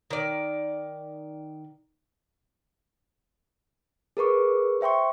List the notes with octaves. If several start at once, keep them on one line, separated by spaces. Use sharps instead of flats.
D#3 D5
G#4 A#4 B4 C#6 D6
C5 E5 G5 C6 C#6